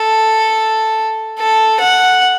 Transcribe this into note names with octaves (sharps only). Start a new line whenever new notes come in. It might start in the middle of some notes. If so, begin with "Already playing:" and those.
Already playing: A4
A4
F#5